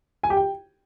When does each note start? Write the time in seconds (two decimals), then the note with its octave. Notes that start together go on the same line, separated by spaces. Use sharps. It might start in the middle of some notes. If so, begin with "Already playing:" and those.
0.23 G#5
0.30 G4
0.37 G5